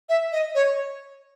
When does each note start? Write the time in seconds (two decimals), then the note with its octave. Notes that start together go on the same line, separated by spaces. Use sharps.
0.09 E5
0.32 D#5
0.55 C#5